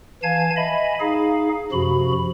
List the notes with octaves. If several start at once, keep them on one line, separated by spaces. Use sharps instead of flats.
E3 F5 G#5 A5 G#6
D#5 E5 G#5 B5
D#4 G#4 F5
F#2 C3 F3 F#4 B5